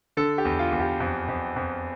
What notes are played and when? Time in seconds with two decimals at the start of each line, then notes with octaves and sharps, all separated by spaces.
0.17 D3 A4
0.38 G4
0.45 E2
0.59 F4
0.73 E2
0.80 G4
1.00 F2
1.28 F2
1.56 F2